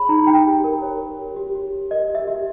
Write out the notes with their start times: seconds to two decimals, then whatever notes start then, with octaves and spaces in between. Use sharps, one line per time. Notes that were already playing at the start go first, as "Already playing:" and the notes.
Already playing: G#4 C#5 B5
0.09 D#4 A#5
0.27 D#4 G5
0.46 G4
0.64 A#4
0.82 C#5
1.00 A#4
1.19 G4
1.36 G4
1.55 G4
1.73 G4
1.91 A#4 D#5
2.09 G4
2.15 E5
2.28 G4